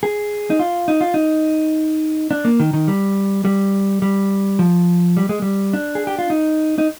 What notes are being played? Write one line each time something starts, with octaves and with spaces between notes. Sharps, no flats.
G#4
D#4
F4
D#4
F4
D#4
D4
A#3
D#3
D#3
G3
G3
G3
F3
G3
G#3
G3
D4
G#4
G4
F4
D#4
D#4